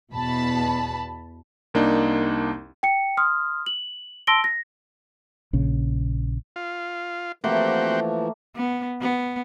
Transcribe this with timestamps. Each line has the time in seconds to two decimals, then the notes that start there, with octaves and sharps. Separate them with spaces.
0.13 E2 B2 A5 B5
1.74 C2 A#3 D4 D#4
2.83 G5 C#7
3.17 C6 D#6 F6
3.66 F#7
4.27 A5 C6 E6 A#6 D7 G7
4.44 A#6
5.53 A#1 C#3
6.56 F4
7.44 E3 F3 A3 A#3 C4 F#4 G4 F#5
8.56 B3
9.01 B3